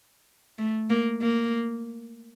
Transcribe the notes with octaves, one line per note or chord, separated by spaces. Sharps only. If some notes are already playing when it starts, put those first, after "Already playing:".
A3
A#3
A#3